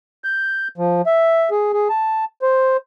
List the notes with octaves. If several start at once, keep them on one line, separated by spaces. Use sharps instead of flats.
G6
F3
E5
G#4
G#4
A5
C5